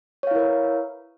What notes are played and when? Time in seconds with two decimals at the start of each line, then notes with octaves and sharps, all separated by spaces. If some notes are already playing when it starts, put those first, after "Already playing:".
0.23 C#5
0.27 F5
0.31 E4
0.35 A#4
0.39 B4